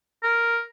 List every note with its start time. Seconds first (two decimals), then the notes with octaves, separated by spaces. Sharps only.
0.23 A#4